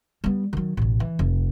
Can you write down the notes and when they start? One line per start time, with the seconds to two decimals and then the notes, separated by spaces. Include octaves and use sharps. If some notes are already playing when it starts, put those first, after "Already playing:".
0.24 G3 B3
0.53 D#3 F#3
0.77 A1 B2
1.00 E3
1.19 F1